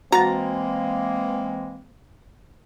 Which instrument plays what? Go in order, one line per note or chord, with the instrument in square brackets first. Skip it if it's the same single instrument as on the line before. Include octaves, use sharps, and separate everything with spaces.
[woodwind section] E3 G#3 A#3 [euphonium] C4 [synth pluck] F#4 A6 [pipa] A#5